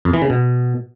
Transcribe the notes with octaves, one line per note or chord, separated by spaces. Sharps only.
F2
E3
C#3
B2